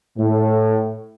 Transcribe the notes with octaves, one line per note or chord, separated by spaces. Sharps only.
A2